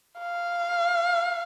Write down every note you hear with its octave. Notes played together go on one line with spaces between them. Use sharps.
F5